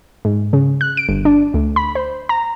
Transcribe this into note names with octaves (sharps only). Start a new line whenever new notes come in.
G#2
C#3
F#6
D7
G1
D4
D2
B5
C5
A#5